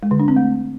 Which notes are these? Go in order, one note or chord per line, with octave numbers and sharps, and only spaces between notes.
G#3
D3
D4
C4
A3